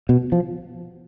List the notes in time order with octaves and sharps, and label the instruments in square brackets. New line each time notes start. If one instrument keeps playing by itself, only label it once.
[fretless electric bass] B2
F3